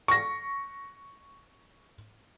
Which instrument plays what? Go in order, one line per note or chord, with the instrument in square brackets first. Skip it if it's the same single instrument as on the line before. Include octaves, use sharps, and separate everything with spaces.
[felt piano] C#6 A#6